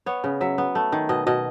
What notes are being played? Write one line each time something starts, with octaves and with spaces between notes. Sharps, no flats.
B3 C#5
C#3
F#3 E5
B3
A3
D#3
B2 D#5
B2 D#5